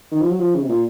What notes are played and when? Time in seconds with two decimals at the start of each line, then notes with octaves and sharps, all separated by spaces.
0.11 D#3
0.21 F3
0.30 F#3
0.40 F3
0.55 C#3
0.63 C3
0.69 A#2